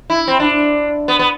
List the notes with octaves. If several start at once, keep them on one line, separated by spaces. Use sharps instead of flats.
E4
C4
D4
B3
B3